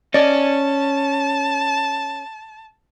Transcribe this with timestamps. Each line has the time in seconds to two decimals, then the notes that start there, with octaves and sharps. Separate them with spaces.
0.14 C#4 D5 D#5 A5